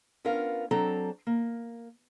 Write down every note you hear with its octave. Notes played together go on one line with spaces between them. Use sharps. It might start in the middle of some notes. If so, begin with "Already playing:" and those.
B3 C#4 D4 F4 A#4 F5
F#3 C4 D4 A4 A#5
A#3